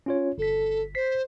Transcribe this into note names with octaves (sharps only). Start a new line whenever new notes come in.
C#4 F4 C#5
G1 A4 B6
C5 B6 C7